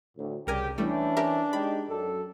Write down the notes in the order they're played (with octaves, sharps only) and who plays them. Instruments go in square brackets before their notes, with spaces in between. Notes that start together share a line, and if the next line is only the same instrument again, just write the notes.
[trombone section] D2 A2
[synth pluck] C2 A#4 G#5 [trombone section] C#3 G3 [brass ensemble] G4
[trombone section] E3 C#4 [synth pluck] G3 A3 [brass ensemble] D4
[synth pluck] G4 A#4 E5
[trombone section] G#3 D#4 G4 [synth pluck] B5
[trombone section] F#2 A4